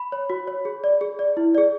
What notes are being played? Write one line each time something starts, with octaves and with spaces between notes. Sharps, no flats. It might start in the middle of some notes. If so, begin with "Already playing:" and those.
Already playing: B5
C#5
F#4
C#5
G#4
D5
G#4
D5
E4
G#4 D5